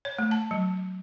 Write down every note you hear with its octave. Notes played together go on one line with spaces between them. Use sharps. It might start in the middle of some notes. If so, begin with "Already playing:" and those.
C#5
A3
A5
F#3